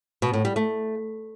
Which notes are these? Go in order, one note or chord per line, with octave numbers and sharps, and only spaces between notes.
B2
A2
G3
A3